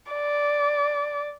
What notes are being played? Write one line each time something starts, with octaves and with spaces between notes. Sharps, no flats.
D5